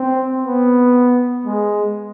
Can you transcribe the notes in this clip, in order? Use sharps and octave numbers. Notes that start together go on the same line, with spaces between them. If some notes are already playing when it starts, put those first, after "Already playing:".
Already playing: C4
B3
G#3